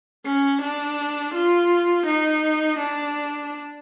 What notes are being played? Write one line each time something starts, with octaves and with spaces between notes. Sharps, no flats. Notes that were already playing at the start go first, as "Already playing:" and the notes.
C#4
D4
F4
D#4
D4